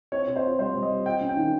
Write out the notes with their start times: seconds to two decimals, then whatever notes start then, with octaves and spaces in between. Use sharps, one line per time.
0.12 C4 C#5
0.28 C4
0.36 C5
0.44 F4
0.59 G3 C5
0.75 G3
0.82 D#5
0.90 C4
1.06 F4 G5
1.21 C#4
1.29 G5
1.37 D#3